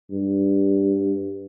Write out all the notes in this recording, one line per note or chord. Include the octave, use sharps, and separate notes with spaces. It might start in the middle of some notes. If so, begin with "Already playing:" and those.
G2